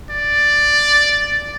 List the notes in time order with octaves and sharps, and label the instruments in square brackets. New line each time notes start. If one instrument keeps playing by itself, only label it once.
[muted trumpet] D5